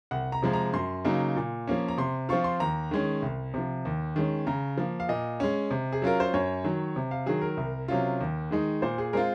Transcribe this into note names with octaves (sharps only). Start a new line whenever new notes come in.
C2 F#5
A#5
C3 F3 G#3
A#5
F#2 C6
C#3 F#3 A#3 D#4
A#2
F3 A#3 C#4
A#5
C3 C6
F3 C4 F4 C#6
C6
D#2 A#5
D#3 G#3 C#4
C2
C3 F3
D#2
D#3 G#3 C#4
C#3 A#5
F3 A#3
F5
A#2 D#5
G#3 C#4
C3
G#4
F#3 C#4 F4 A#4
C5
F#2 C#5
D#3 F#3
C3
F5
D#3 F#3 G#4
A#4
C2
C3 F#3 C#4 F4
D#2
D#3 G#3 D#4
A#2 C5
G#4
G#3 C4 F4 A#4